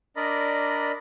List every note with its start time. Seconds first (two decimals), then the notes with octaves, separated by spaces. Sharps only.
0.16 D4 A#4 D5 D#5 B5